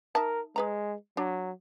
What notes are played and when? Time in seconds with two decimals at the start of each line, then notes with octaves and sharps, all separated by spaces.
0.15 D#4 A#4 E5 A5
0.56 G#3 G#4 B4 A#5
1.17 F#3 D4